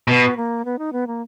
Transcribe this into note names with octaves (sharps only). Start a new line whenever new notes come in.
B2 B3
A#3
B3
D#4
B3
A#3